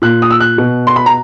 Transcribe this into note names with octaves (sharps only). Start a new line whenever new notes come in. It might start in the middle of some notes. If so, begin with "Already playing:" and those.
A#2 F#6
D#6
E6
F#6
B2
C6
B5
A#5